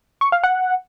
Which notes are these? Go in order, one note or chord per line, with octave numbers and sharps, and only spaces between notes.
C#6
F5
F#5